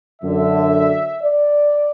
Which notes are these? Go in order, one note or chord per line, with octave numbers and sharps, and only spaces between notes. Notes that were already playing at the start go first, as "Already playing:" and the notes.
F#2 D3 E5
D5